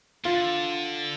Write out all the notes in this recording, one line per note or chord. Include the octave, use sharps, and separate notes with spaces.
D3 F4